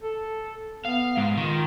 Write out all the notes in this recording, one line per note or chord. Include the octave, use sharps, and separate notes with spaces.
A4
B3 F5
G#2
D#3 F4